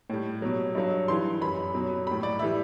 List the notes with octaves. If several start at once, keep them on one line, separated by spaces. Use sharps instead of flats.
A2 G3
B2 F#3
G2 F#3
G2 E3 G3 C6
F#2 F#3 B5
B2 F#3
A2 G3 B5
D5
E3 G3 E5